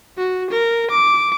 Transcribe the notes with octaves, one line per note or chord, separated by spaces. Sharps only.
F#4
A#4
D6